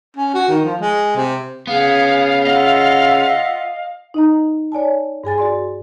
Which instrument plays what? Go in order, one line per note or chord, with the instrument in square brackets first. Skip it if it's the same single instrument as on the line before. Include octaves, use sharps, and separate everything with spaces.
[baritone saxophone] C#4
F#4
D#3
F3
G#3
C3
[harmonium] C#3 [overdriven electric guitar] B3 [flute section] G#4 [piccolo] F5
[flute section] F4 E5 F#5 [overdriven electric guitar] D#5
[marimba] D#4 D#5 A#5
C#5 D5 G#5 A5
G2 G#4 G#5 A6
F#4 D5 C6